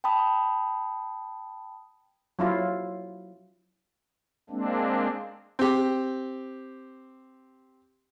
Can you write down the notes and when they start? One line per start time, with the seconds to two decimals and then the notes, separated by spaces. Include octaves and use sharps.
0.04 G5 A5 B5 D#6
2.39 F#3 E4 F4
4.50 G#3 A#3 C4 D4
5.59 C4 G4